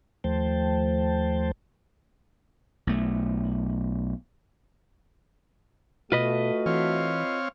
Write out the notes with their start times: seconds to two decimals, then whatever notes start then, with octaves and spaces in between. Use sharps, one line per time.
0.24 D#2 F3 A3 C5 G5 A5
2.87 B1 A3
6.12 B2 A3 F4 F#4 B4 D#5
6.66 E3 C4 C#5 F5